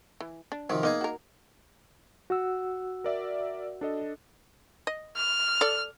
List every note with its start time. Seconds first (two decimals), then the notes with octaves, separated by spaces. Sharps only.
0.20 E3
0.52 D4
0.70 C3 D#3 F3 F#3
0.83 A#3 B3 D#4 G#4 D#5
1.01 F#4 A#4
2.30 F#4 F#5 E6
3.04 A#4 D5 E5
3.81 D4 A4 D#5
4.87 D#5
5.16 F6
5.61 A4 D5